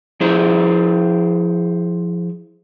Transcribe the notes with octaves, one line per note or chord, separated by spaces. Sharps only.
F3 E4 G#4 C5